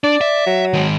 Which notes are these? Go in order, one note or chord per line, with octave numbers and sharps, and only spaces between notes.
D4 D5
E5
F#3
D#3 G#3